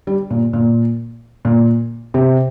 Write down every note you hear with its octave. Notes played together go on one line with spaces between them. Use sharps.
G3
A#2
A#2
A#2
C3